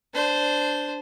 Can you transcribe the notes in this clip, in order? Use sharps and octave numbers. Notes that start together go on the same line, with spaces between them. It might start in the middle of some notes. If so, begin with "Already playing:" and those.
D4 C5